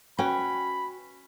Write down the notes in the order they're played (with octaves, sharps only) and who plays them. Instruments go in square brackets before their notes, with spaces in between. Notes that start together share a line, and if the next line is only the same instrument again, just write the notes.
[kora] C#4 [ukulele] F#4 B4 G5 [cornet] B5